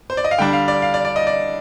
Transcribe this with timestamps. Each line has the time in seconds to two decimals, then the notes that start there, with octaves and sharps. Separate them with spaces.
0.10 C5
0.17 D5
0.24 D#5
0.31 F5
0.38 D3 G3 D4 G5
0.53 F5
0.68 D5
0.82 F5
0.94 D5
1.05 D5
1.16 D#5
1.27 D5